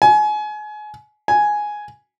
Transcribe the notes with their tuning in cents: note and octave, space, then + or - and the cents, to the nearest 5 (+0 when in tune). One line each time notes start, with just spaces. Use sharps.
G#5 +30
G#5 +5